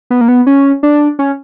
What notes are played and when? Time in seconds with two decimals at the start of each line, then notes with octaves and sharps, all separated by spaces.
0.10 B3
0.21 A#3
0.28 B3
0.47 C#4
0.83 D4
1.19 C#4